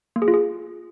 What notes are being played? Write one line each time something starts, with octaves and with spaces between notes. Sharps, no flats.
A#3
G#4
F4
G#4